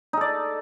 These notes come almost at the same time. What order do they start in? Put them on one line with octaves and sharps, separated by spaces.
D#4 A4 D5